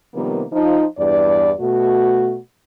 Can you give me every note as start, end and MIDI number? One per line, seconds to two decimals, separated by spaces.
0.14 0.43 48
0.14 0.43 51
0.14 0.43 53
0.14 0.43 55
0.14 0.43 58
0.14 0.43 59
0.52 0.85 53
0.52 0.85 63
0.98 1.52 40
0.98 1.52 43
0.98 1.52 74
1.60 2.38 47
1.60 2.38 57
1.60 2.38 66